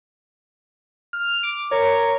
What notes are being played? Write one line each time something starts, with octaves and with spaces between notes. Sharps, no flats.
F6
D6
A#4 C#5